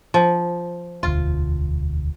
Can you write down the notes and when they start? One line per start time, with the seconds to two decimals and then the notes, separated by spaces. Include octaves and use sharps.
0.14 F3
1.03 E1 D2 F4